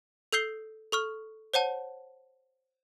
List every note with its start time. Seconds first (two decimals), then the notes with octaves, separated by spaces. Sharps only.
0.32 A4 E6 G6 C7 G7
0.92 A4 C#6 F6
1.54 C5 C#5 F#5 A5